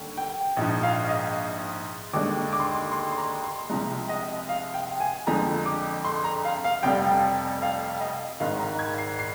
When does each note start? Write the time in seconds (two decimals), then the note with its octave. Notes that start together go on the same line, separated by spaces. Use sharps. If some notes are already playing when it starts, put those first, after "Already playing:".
Already playing: D#2 D3 G3
0.17 G5
0.57 A#1 G#2 F3
0.83 F5
1.09 D#5
2.13 D#2 D3 G#3 D6
2.53 D6
2.60 C6
2.67 D6
2.92 C6
3.11 C6
3.18 A#5
3.44 C6
3.69 C2 C3 F3 G#3 A#5
4.09 D#5
4.49 F5
4.74 G5
5.00 G#5
5.27 F2 D3 F3 G#3 A#5
5.66 D6
6.05 C6
6.24 A#5
6.45 F5
6.64 F5
6.83 F1 F2 C3 G3 G5
7.62 F5
8.01 D#5
8.40 G#1 G#2 D#3 F5
8.59 A#5
8.79 G#6
8.98 C7
9.19 C7